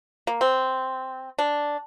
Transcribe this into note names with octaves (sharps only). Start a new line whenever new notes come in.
A#3
C4
D4